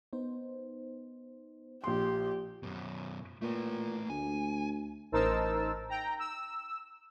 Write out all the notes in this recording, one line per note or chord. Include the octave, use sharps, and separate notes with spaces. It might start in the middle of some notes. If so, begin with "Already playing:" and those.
B3 D#4 C5
A#1 G4 C6
F#2 B2
A#2 A3 B4
D2 G#5
A1 D#4 A#4 C5 A5 E6
G5 A#5
E6